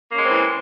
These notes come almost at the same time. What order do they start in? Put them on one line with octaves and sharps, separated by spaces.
A#3 C#4 G#3 C4 E3